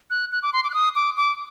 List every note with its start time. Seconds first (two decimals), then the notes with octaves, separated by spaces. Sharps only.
0.10 F#6
0.32 F#6
0.43 D6
0.53 C6
0.64 D6
0.70 F#6
0.74 D#6
0.95 D6
1.17 D6